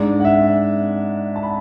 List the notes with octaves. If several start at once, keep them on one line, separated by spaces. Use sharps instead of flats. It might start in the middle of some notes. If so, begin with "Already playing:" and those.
Already playing: G#2 G#3 D4 D5
F#5
E5
A5
B5